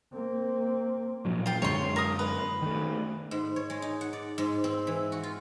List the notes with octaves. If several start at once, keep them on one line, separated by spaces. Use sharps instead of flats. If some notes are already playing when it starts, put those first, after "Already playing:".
A#3 C4
A#2 F3 F#3
F4 G5
F#2 D3 G#3 C#5 C6
A#4 D#6
B4
D#3 A3
G#2
C#5
G#3
D#4
F#5
D5
G#2
C4
E3
F#4
F4